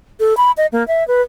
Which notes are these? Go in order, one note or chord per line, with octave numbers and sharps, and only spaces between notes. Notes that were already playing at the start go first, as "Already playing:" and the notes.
A4
B5
D#5
A#3
E5
B4